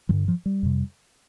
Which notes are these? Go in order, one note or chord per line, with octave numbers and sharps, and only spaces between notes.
G2 D3 F3
F3
G3
F2 C3